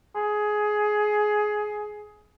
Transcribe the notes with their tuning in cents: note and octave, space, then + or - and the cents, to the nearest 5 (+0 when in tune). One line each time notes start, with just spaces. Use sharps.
G#4 +15